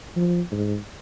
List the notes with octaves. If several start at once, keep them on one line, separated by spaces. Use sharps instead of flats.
F3
G#2